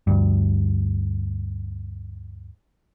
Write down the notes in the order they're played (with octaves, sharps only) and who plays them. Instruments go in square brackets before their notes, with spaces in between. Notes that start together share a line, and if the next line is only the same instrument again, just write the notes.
[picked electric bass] D2 G2